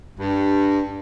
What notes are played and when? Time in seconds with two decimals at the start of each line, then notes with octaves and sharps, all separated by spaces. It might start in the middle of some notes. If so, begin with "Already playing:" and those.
0.20 G2